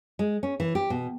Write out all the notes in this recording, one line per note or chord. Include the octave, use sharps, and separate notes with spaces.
G#3
C#4
E3
G4
B2